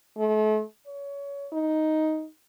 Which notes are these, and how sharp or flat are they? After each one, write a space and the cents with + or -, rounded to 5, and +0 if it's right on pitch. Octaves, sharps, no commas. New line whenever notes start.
A3 -40
C#5 +25
D#4 +5